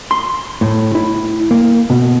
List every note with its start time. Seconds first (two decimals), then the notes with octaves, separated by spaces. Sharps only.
0.11 C6
0.61 A2
0.95 E4
1.51 A#3
1.90 B2